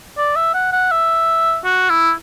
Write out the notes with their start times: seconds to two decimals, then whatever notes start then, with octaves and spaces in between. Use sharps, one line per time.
0.18 D5
0.36 E5
0.54 F#5
0.73 F#5
0.91 E5
1.65 F#4
1.90 E4